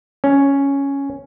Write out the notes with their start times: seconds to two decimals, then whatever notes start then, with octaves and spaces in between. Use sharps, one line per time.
0.24 C#4